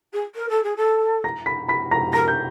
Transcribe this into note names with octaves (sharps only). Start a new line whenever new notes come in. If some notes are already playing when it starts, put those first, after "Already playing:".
G#4
A#4
A4
G#4
A4
A#5 A#6
B5 B6
B5 B6
A#5 A#6
A#4 A#5 A#6
G6